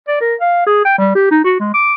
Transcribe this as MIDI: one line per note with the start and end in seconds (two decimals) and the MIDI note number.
0.08 0.20 74
0.21 0.35 70
0.41 0.62 77
0.66 0.85 68
0.85 0.93 79
0.98 1.11 55
1.15 1.30 67
1.31 1.41 63
1.44 1.55 66
1.60 1.72 56
1.74 1.94 86